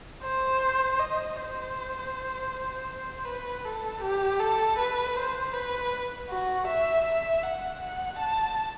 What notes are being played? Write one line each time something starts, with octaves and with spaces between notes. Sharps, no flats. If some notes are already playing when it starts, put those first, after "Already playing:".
C5
D#5
C5
B4
A4
G4
A4
B4
C5
B4
F#4
E5
E5
F#5
F#5
A5